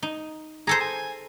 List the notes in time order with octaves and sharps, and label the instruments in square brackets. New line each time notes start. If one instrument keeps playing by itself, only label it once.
[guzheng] D#4
[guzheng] G#4 A4 C5 [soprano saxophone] A#5
[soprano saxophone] G#5